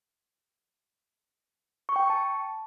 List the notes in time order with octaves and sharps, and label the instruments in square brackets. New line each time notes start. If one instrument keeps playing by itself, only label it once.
[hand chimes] C#6
G5
C#6
A5